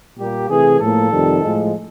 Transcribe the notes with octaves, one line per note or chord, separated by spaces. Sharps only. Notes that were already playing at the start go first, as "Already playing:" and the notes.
A#2 G3 A#3 G4
C3 E3 A3 G#4
A2 F3 A#3 A4
F2 C3 D#3 G3
A2 F3 G#3